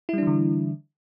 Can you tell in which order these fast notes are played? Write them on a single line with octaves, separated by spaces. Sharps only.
E4 G3 D4 E3 D3